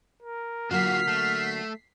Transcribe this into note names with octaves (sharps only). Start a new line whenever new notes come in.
A#4
D3 F#3 A#3 F4 F#4 F6 B6 C7
A3